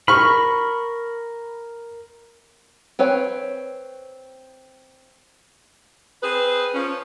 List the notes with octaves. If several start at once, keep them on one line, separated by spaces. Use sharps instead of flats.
A#4 B5 C#6 F6
C4 B4 C#5 G5
C4 G#4 B4
F3 C#4